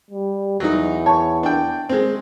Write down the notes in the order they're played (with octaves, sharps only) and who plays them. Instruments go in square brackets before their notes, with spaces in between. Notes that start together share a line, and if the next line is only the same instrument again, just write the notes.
[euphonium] G3
[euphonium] E2 [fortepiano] F#3 D#4
[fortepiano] C#5 [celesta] A5 C#6
[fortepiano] D4 G5
G#3 C4